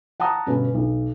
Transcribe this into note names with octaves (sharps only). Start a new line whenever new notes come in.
F#5 A5 A#5 D#6
G2 B2 D3 C#4
B1